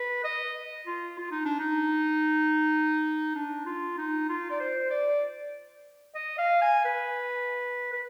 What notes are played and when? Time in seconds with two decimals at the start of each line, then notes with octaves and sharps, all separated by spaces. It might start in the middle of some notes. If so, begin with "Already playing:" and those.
Already playing: B4
0.24 D#5
0.86 F4
1.18 F4
1.31 D#4
1.45 D4
1.59 D#4
3.35 D4
3.66 F4
3.98 D#4
4.29 F4
4.50 D5
4.60 C5
4.90 D5
6.15 D#5
6.38 F5
6.62 G#5
6.85 B4
7.93 B4